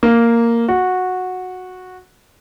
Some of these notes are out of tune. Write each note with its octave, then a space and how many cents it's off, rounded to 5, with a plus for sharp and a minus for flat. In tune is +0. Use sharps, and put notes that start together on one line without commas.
A#3 -5
F#4 -10